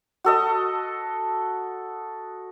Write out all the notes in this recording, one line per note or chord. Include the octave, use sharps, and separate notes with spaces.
F#4 A4 D#5